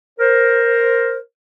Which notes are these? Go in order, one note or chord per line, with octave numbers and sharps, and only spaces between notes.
A#4 C5